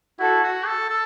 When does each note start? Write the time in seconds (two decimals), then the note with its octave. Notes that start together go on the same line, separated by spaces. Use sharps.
0.19 E4 F#4 A4
0.44 F#4
0.67 A4
0.90 A4